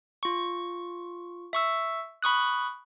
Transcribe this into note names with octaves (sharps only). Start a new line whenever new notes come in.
F4 C#6
E5 C#6 E6
B5 C#6 D#6 F#6